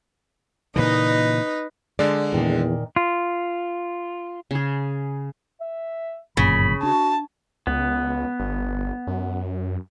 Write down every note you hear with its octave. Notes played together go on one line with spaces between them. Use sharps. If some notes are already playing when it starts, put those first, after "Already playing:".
A#2 C#3 E3 D#4 B4 D#5
D3 G#3 D5
E2 A#2 D#3
F4
C#3 G#4
E5
G1 F#2 A#2 C#3 B5
D4 F#4 A5
C#2 B3
G1
F#2